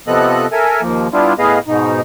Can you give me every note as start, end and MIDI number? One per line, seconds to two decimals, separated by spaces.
0.07 0.46 48
0.07 0.46 53
0.07 0.46 59
0.07 0.46 69
0.07 0.46 75
0.07 0.46 90
0.52 0.81 69
0.52 0.81 70
0.52 0.81 76
0.52 0.81 80
0.82 1.08 39
0.82 1.08 53
0.82 1.08 58
1.13 1.33 55
1.13 1.33 59
1.13 1.33 62
1.13 1.33 64
1.13 1.33 65
1.39 1.59 45
1.39 1.59 59
1.39 1.59 68
1.39 1.59 71
1.39 1.59 75
1.39 1.59 77
1.68 2.01 44
1.68 2.01 47
1.68 2.01 63